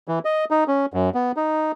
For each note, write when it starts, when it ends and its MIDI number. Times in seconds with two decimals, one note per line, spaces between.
0.08 0.19 52
0.25 0.45 75
0.51 0.64 63
0.68 0.86 61
0.94 1.10 42
1.14 1.32 59
1.37 1.72 63